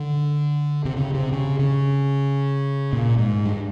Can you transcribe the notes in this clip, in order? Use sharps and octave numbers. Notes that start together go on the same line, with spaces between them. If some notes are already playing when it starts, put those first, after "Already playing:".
Already playing: D3
C3
C#3
C3
C#3
C#3
A#2
G#2
G2